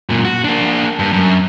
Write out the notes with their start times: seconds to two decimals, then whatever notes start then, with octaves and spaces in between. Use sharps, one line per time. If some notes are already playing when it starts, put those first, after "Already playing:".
0.09 F#2 A#2
0.25 F#4
0.44 A#3 D4
0.99 G2
1.13 F#2